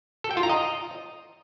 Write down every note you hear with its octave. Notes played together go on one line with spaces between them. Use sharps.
A4
G5
F4
A#5
D#5